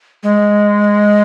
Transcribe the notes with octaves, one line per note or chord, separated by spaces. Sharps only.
G#3